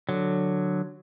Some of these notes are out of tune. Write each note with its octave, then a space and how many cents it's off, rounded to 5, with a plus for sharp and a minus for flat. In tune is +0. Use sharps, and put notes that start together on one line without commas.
D3 +15 F#3 +0